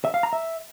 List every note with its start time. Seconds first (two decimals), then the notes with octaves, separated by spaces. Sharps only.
0.05 E5
0.14 F5
0.23 A#5
0.33 E5